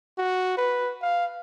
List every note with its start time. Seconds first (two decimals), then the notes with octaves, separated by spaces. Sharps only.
0.18 F#4
0.58 B4
1.02 F5